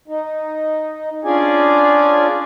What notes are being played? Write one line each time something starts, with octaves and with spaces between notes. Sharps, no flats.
D#4
C#4 D4 F4 G#4 D5 G#5